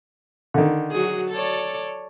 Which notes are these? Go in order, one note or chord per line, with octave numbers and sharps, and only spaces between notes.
D3 D#3
F#3 F#4 G#4
A4 C#5 D5